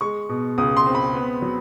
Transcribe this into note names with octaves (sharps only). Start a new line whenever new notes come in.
G#3 C#6
B2
C#2 D#6
C6
C4
B5
B3
F#3